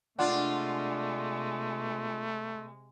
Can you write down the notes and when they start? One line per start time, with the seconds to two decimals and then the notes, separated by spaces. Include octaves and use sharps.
0.19 C3 G#3 A3 D4 F4 D5 F#5 C6